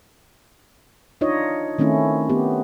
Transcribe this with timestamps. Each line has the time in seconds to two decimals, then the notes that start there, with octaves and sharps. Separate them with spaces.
1.21 D4 D#4 F4 C#5 D#5
1.78 D#3 A3 C4 C#4 E4
2.29 B3 G4